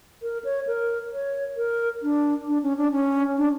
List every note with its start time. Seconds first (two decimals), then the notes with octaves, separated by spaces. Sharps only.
0.22 A#4
0.44 C#5
0.67 A#4
1.12 C#5
1.57 A#4
2.03 D4
2.47 D4
2.63 C#4
2.77 D4
2.92 C#4
3.38 D4